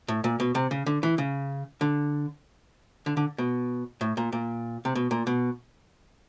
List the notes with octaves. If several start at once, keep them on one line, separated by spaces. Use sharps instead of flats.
A2
A#2
B2
C3
C#3
D3
E3
C#3
D3
D3
D3
B2
A2
A#2
A#2
C3
B2
A#2
B2